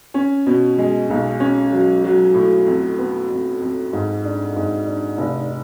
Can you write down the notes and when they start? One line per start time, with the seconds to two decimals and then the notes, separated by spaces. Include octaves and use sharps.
0.14 C#4
0.46 B2
0.78 G#3
1.10 B1
1.40 C#4
1.73 F#3
2.04 F#3
2.34 A2
2.66 F2
2.98 B3
3.30 F2
3.60 F2
3.93 G#2
4.24 D4
4.56 G#2
4.86 D4
5.18 F1